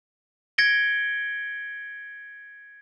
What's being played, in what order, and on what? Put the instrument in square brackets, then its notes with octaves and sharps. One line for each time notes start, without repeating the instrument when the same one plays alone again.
[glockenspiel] G#6 A#6 C#7 D7 G7